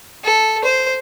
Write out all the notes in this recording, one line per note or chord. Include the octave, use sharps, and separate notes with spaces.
A4
C5